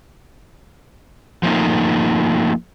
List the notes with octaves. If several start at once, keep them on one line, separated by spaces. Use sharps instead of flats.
F3 A3 A#3 D#4